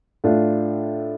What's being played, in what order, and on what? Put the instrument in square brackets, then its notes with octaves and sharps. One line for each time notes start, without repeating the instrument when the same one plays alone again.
[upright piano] A2 A3 D4 F4